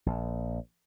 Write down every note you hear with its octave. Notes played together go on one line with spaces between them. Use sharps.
A#1